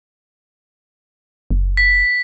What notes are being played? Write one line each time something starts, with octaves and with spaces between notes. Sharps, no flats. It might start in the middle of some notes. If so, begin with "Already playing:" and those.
F#1
B6